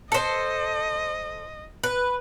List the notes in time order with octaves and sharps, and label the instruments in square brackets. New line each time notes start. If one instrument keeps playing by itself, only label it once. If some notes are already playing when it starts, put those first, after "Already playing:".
[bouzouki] A4 C5 [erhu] D#5
[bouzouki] B4